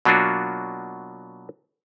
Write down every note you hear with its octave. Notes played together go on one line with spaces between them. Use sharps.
B2 F#3 A#3 D4 F4 F#4